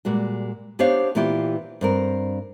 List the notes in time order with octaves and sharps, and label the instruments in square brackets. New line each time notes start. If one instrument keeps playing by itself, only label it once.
[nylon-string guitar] A#2 G3 G#3 F#4
B3 D4 G4 C5 C#5 F5
A#2 E3 B3 E4 F4 G4
G2 C4 A#4